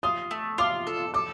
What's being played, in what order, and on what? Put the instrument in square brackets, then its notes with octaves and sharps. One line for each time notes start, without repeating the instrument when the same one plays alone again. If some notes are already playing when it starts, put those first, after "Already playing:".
[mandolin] F4 [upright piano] D#6
[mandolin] A3
[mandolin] F4 [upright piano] D6
[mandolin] A4
[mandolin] A4 [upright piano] D6